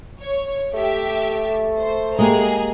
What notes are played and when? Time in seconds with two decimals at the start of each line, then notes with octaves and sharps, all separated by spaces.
0.20 C#5
0.73 A3 G4 E5
1.79 C5
2.19 G#3 A#3 G4 G#4 A#5